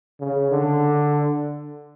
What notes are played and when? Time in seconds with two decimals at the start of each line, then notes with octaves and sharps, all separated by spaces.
0.20 C#3
0.51 D3